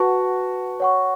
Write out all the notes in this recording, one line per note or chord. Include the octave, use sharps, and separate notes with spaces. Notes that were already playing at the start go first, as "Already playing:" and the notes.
Already playing: F#4 B4 F#5 A5 C#6
C#5 F#5 C#6